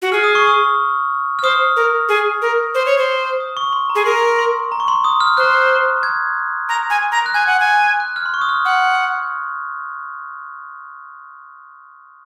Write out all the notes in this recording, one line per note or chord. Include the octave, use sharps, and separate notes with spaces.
F#4
G#4 F6
D#6
C#6
D#6
F6
C5 D#6
A#4
G#4
A#4
C5
C#5
C5
D#6
C#6
C6
A#5
G#4
A#4 C6
C6
A#5
C#6
C6
D#6
F6
C5 F#6
G#6
A#5
G#5
A#5
F#6
G#5 G#6
F#5
G#5
F#6
F6
C6
C#6
D#6
F6
F#5 F6